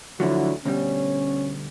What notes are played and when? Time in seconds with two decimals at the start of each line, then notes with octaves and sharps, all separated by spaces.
0.20 D2 D3 F3 F#3 E4 F#4
0.65 D2 B2 G3 C#4